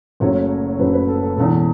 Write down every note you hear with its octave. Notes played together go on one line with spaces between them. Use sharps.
F#1 F#2 C#3 F#3 A3 C#5
F#1 F#2 C#3 F#3 A3 B4
B4
A4
A4
E1 E2 E3 A4